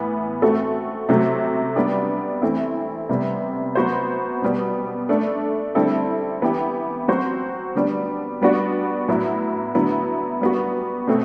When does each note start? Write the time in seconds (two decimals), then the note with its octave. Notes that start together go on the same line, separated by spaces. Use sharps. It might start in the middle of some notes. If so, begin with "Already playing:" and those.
Already playing: A2 E3 B3
0.42 A3 C4 F#4 A4
1.09 C3 F#3 A3 C4
1.76 G3 B3 D4 G4
2.42 E3 A3 C4 E4
3.09 C3 G3 B3
3.75 F#3 B3 F#4 C5
4.42 B2 G3 B3
5.09 A3 D4 A4
5.75 D3 G3 C4 E4 A4
6.42 E3 B3 E4 G4
7.08 F#3 C4 F#4 C5
7.75 D3 G3 B3 D4
8.41 G3 B3 D4 F#4
9.08 A2 F#3 B3 E4
9.75 D3 F#3 B3 E4
10.41 G3 B3 F#4
11.07 B2 A3 C4